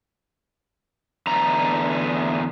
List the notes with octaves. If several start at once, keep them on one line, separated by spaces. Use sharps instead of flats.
E2 D3 A3 D#4 A#5